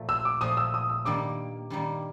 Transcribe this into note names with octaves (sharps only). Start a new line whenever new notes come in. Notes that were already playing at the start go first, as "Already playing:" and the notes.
Already playing: A#2 F3 A3
E6
D6
A#2 F3 A3 D#6
E6
D#6
E6
G2 D#3 G3 A#3 D6
G2 D#3 G3 A#3